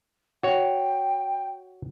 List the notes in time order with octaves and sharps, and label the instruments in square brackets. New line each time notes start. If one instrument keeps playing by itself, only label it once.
[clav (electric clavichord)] F#4 C#5 [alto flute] G5